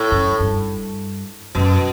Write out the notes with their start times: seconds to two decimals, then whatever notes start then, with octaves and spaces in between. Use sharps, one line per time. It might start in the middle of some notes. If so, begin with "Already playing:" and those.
Already playing: A2
0.11 F#2
0.40 G2
1.55 F#2 B2